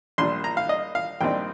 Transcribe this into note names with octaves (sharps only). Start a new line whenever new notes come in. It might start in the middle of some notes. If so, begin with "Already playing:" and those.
A#1 A#2 G3 C6
A#5
F5
D#5
F5
A#1 A#2 G3 C4 D#4 G5